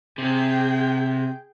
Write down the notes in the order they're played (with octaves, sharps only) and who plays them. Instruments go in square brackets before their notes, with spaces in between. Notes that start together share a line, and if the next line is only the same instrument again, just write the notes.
[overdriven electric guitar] C3 [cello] G#4 G5